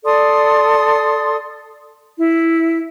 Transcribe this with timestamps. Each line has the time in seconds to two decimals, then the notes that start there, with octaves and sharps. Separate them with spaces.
0.04 A4 D5 C6 D#6
2.18 E4